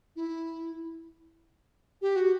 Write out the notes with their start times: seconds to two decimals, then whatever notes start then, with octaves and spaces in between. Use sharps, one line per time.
0.16 E4
2.02 G4
2.16 F#4